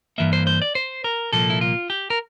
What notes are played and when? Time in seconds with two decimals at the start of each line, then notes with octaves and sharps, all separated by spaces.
0.18 G2 E3 A#3 E5
0.33 C5
0.47 C5
0.62 D5
0.75 C5
1.04 A#4
1.33 C2 A#2 F3 A#3 A4
1.50 E4
1.61 F4
1.90 G4
2.10 A#4